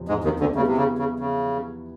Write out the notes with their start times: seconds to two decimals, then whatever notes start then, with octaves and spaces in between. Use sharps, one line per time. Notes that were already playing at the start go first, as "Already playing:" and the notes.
Already playing: E2 C3 F3
0.08 G#2 G#3
0.24 D#2 D#3
0.40 D2 D3
0.55 C#3 G3 B3 E4
0.67 C3
0.77 C#3
0.98 C#3
1.19 C#3